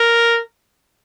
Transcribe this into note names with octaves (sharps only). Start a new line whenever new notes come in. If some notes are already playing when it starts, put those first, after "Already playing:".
Already playing: A#4